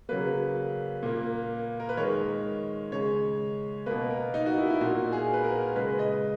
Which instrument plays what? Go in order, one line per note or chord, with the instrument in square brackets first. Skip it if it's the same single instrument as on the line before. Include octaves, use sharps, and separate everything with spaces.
[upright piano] C#3 F#3 A#3 B4
A#2 A#3
A#4
B4
D#3 G#3 C#5
C#3 G#3 C#5
B2 A#3 B4
A#4
D#4
F#4
E4
E4
A#2 A#3 F#4
G#4
B4
A#4
C#3 G#3 B4
D#5